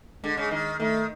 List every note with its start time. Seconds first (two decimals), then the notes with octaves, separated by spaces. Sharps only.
0.24 D3 G#3
0.37 C#3
0.51 D#3
0.80 D#3 A3